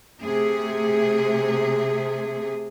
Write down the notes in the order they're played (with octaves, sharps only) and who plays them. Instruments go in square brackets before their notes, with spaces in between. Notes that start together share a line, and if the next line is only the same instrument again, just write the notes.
[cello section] C3 A3 G#4